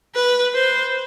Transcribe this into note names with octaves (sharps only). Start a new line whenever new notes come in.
B4
C5